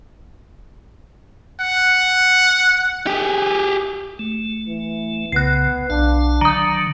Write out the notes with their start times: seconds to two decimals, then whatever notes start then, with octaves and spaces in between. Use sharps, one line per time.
1.60 F#5
3.07 G4 G#4
4.19 A3
4.67 E3
5.32 C2 C#3 B3 F#6 C7
5.90 B1 D4 F5 A5
6.41 D3 D#3 F#3 A#5 D#6